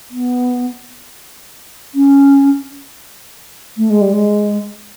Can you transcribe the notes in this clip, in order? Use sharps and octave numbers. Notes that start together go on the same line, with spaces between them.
B3
C#4
A3
G#3
G3
G#3